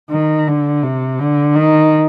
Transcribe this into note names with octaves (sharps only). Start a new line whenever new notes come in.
D#3
D3
C3
D3
D#3